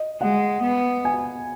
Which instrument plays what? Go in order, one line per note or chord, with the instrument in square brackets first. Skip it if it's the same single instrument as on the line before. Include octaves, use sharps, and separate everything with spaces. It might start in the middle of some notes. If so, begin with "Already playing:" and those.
Already playing: [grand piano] D#5
[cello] G#3 [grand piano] F#5
[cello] B3
[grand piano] G#5